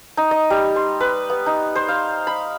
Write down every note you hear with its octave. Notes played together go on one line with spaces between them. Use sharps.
D#4
D#5
G3
C6
B4
B3
D#4
C5
F5
B5